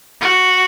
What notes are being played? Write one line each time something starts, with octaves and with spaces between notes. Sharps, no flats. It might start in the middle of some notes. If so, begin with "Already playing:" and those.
F#4